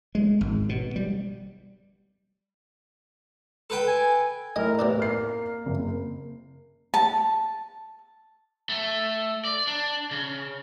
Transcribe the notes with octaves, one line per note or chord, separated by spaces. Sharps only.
G#3
G#1
B2
G3
A4 B4 G5
G#5
A2 A#4 D#5 G5
C3 A#3 B3 D4
F6 C7
F#1
A5
A3
D5
D4
C#3